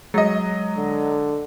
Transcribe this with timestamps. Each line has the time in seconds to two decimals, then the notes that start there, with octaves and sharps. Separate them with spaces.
0.14 F#3 G#3 D#5
0.77 D3